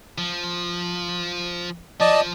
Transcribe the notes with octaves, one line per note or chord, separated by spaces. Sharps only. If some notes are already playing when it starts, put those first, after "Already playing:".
F3
F3 D5 D#5 A5